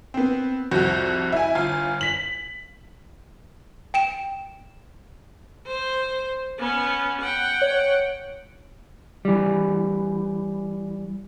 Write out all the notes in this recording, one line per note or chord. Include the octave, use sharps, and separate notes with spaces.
B3 C4
C2 F2 F#4 G6
E4 G#5
G1 F4 G#5
B6 F#7
G5 D7 E7
C5
B3 C#4
F#5 G5
C#5
E3 G3